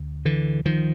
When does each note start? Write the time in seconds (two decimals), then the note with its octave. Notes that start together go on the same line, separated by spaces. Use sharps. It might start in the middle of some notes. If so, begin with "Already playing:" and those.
Already playing: D2
0.25 D3 E3
0.65 D#3 F3